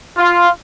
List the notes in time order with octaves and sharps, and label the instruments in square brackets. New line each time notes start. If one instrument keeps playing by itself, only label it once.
[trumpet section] F4